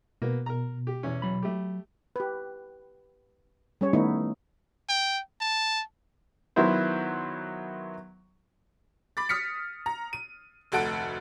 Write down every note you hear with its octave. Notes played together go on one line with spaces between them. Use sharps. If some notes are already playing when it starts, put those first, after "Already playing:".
B2 A#3 B3
A#4 A#5
G4
E2 C#4
F#3 B5
A3 G4
G4 B4
G3 C#4 C#5
D#3 A3 B3 D#4 E4
G5
A5
D#3 F#3 B3 E4 C5
B5 D6 A6
D#6 F6 B6 C#7
A#5
D#7
F1 D2 A4 F#5 D7